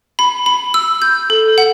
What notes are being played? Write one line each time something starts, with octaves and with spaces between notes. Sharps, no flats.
B5
B5
E6
G6
A4
F#5